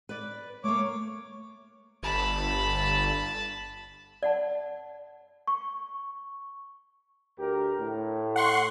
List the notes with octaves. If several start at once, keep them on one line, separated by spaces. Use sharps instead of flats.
B4 D5
A3 A#3 C#5 D6
G1 A5 B5
D5 F#5 A5
C#6
D2 G4 A#4
A2
F#5 C6 C#6